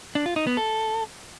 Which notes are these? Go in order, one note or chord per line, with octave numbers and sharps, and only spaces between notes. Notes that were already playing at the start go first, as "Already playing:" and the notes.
D4
F4
D#4
B3
A4